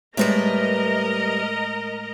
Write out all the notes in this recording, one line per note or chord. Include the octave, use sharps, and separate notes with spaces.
A2 G3 G#3 A#4 B4 D#5 E5 A#5